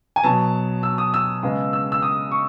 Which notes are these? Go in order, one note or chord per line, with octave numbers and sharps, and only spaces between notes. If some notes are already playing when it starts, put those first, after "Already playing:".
G#5
B2 F#3 B3 A5
E6
D#6
E6
C#3 G#3 B3
E6
E6
D#6
C#6